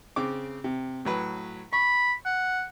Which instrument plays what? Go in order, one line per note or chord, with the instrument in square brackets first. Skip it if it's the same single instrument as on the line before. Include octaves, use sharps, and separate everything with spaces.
[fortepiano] C#3 C4 D6
C3
A2 F#3 B4
[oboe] B5 [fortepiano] C#6
[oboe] F#5